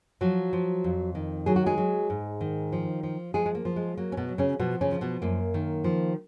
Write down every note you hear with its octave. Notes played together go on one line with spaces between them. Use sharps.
F3 F#3 F#4
F3
F2
D#3
F#3 G#4
F#4
G#3 G#4
F#3
G#2
D#3
F3
F3
F3 G#3 G#4
G#3
A#3
F3
G#3
F#3 A#3
C#4
B2 B3
F#3
C#3 C#4
B2 F3 B3
C#3 C#4
F3
B2 B3
F#2 A#3
D#3
F3